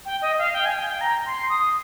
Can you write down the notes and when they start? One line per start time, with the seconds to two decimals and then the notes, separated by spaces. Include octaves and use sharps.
0.05 G5
0.22 D#5
0.38 F5
0.53 G5
0.65 G#5
0.78 G5
0.90 G5
1.01 A#5
1.26 C6
1.50 D#6